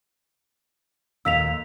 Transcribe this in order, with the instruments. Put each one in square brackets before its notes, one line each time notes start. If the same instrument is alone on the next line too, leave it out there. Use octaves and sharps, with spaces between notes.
[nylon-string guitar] D#2 A#2 F5 [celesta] E6 B6 F7